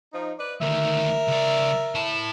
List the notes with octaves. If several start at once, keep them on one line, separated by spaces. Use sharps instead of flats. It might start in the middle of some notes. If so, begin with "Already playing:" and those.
F3 D#4
B4 D5
D2 D#3 A#4 E5
C#2 D5
E4 A5